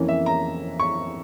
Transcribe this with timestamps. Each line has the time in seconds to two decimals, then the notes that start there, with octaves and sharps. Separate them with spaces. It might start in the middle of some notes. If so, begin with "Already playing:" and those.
Already playing: F2 E3 A#3 C#4
0.08 E5
0.26 A#5
0.79 C#6